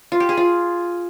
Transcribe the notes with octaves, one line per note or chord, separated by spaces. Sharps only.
F4
G4
G#4
F4